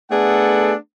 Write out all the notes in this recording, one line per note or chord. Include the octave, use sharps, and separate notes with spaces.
A3 B3 D4 G#4 A4 F#5